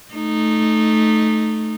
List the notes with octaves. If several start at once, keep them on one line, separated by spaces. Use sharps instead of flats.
A3 D#4